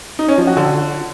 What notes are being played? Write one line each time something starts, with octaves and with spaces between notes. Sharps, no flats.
D#4
C#4
F3
F#4
D3